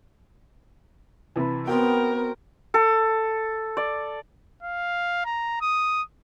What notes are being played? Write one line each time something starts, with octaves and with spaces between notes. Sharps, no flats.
C3 E3 B4 A5
B3 C4 F#4 A#4 G5
A4
D5
F5
A#5
D#6